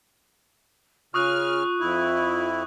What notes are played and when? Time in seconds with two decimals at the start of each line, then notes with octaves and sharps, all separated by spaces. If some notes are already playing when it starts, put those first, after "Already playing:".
1.14 C#3 F4 C#6 D#6 F6 F#6
1.80 F2 E4